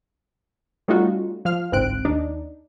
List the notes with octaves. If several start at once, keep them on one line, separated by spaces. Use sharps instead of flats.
G3 A3 C#4 D#4 F4 F#4
F3 F5 F6
G1 C2 G#2 C4 F#6 D7
D#2 D4 D#4